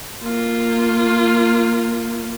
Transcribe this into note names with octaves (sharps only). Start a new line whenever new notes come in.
A#3 F4